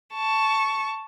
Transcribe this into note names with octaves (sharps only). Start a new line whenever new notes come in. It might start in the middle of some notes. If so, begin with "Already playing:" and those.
A5 C#6